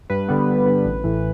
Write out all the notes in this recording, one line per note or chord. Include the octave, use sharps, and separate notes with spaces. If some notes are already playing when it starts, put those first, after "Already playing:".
G2 B4
D3 G3 B3
G2
D3 G3 B3
A1
A2 E3